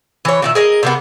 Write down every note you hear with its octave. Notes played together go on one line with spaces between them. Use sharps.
E3 C#5
A#2 D#3 E5
G#4 A#4 D#5
C3 A#3 B3